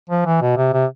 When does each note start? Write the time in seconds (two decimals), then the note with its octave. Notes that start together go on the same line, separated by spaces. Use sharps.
0.10 F3
0.26 E3
0.41 B2
0.57 C3
0.73 C3